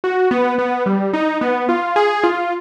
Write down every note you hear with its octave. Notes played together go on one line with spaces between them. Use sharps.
F#4
B3
B3
G3
D#4
B3
F4
G#4
F4